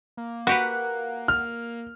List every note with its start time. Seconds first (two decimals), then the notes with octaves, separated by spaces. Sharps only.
0.17 A#3
0.47 F#4 G4 B4 F#5
1.28 F6